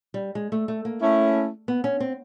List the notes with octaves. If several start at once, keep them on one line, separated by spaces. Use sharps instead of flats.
G3
G#3
A3
A3
A#3
A3 C#4 E4
B3
C#4
C4